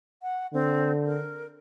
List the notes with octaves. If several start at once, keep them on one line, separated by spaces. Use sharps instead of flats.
F#5
D3 C4
A#4